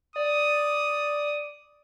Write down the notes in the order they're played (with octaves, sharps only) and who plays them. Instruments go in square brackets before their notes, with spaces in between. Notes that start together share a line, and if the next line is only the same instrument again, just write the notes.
[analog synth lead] D5 [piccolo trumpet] D#6